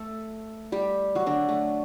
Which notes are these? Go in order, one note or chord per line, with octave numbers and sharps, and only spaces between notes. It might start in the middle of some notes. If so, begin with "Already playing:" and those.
Already playing: A3 A4
G3 G4
F#3 F#4
D3 D4
A3